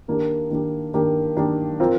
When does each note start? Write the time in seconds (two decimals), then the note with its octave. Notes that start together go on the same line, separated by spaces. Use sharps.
0.08 D#3 A#3 D4 G4
0.50 D#3 A#3 D4 G4
0.94 D#3 A#3 D4 G4
1.37 D#3 A#3 D4 G4
1.80 F3 C4 F4 A#4